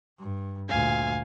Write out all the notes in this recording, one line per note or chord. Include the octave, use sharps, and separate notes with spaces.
G2
D2 A#2 F5 G#5